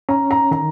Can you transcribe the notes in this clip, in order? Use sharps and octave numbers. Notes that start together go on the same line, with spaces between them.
C#4 A#5
A#5
D#3 A#5